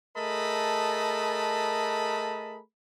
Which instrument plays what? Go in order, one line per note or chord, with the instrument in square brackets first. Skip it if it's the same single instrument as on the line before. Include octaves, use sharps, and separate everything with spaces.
[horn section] A3 G#4 A#4 D#5 A5 B5